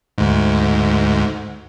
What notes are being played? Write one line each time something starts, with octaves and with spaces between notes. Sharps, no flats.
D2 G#2